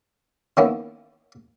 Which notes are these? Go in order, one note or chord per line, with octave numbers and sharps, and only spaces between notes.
D#3 A#3 B3 C#4 E4